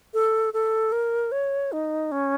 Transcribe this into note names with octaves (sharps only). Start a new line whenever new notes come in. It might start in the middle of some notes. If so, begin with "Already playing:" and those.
A4
A4
A#4
C#5
D#4
C#4